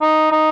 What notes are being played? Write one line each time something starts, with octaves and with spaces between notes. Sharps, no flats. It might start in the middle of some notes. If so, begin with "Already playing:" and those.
D#4
D#4